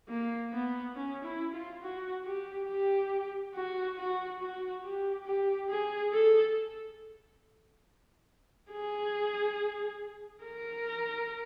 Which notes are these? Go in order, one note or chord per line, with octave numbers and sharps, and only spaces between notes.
A#3
B3
C#4
E4
F4
F#4
G4
G4
F#4
F#4
F#4
G4
G4
G#4
A4
G#4
A#4